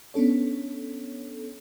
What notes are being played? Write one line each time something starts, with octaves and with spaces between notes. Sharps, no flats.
B3 C#4 D4 A4 C#5